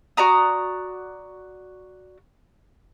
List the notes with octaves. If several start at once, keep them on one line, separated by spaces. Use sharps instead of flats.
F#4 D5 A#5 D#6